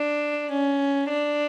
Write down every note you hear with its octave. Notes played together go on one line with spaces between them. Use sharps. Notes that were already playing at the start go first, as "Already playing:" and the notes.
Already playing: D4
C#4
D4